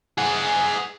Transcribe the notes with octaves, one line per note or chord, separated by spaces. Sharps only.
G#4 F#5